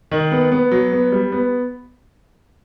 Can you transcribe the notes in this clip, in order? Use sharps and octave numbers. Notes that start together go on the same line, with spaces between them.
D#3
B3
B3
F#3
B3
G3
B3